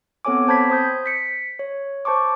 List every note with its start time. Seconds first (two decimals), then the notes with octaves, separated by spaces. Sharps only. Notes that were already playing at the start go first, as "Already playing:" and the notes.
0.25 B3 C4 A4 C#5 G#5 D6
0.47 C4 C5 A5 B5 G#6 B6
0.70 C5 D#6 G6
1.06 B6 C#7
1.59 C#5
2.05 C5 A5 C#6 D6